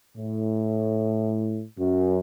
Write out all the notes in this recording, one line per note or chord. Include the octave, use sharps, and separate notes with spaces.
A2
F#2